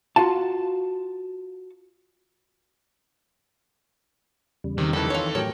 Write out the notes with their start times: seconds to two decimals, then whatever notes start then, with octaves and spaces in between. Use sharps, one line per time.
0.16 F4 F#4 F5 A5
4.64 E2 C#3 G3
4.78 C3 D#3
4.93 F2 D#3 E3 A4 B5
5.10 F4 C#5
5.35 A2 F#3 G4 A#4 C#5 G5